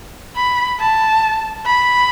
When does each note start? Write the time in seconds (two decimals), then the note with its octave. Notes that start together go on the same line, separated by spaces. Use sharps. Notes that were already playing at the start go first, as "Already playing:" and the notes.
0.36 B5
0.79 A5
1.66 B5